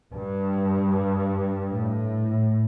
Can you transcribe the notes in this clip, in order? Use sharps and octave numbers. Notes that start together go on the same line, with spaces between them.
G2
A2